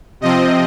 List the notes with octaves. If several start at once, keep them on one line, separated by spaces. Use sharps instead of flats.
C3 F3 C4 D#5